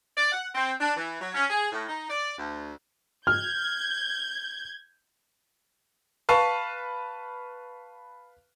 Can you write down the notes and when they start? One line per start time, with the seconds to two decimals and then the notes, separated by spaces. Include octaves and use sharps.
0.17 D5
0.32 F#5
0.55 C4
0.81 D4
0.97 E3
1.21 F#3
1.35 C#4
1.50 G#4
1.72 A2
1.88 D#4
2.10 D5
2.38 D2
3.27 F6 G6 G#6
6.29 B4 F5 A5 C#6